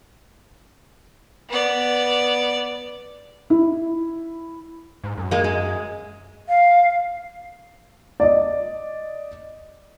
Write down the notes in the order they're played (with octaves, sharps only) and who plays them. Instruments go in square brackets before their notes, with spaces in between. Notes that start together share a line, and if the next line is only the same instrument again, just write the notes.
[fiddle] B3 D5
[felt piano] E4
[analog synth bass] G#2
F#2
[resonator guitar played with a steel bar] G#3 A#3
G#3
[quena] F5
[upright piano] D5 D#5